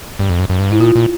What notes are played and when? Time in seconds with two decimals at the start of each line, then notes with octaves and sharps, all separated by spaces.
0.19 G2
0.30 F2
0.40 F#2
0.50 F#2
0.59 G2
0.70 G#2 E4
0.80 A#2 F4
0.95 A#2